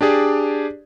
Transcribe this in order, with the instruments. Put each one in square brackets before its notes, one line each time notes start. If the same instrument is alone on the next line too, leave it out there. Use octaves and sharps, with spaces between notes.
[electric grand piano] D4 G4 G#4 D5